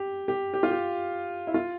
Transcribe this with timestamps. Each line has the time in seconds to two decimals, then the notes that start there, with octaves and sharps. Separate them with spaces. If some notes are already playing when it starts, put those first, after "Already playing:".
Already playing: G4
0.28 G4
0.54 G4
0.63 F4
0.71 G4
1.47 E4
1.54 F4